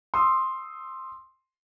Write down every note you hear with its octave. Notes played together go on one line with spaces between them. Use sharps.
C6 D#6 E6